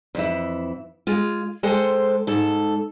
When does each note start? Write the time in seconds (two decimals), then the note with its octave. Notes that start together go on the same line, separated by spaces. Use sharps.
0.15 F2 E3 E5
1.07 G#3 F4
1.63 G#3 A4 C5 G5
2.27 G#2 A4